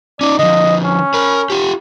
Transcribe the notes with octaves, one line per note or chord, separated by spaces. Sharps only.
C#4 D#4 D5
D3 F3 D#5
C#4
A#4 B5
F4 G4